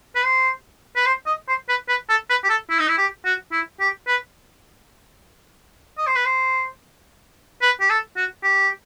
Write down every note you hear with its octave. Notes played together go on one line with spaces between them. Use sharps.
B4
C5
B4
C5
D#5
C5
B4
B4
A4
B4
G4
A4
E4
D#4
E4
G4
F#4
E4
G4
B4
D#5
C5
B4
C5
B4
G4
A4
F#4
G4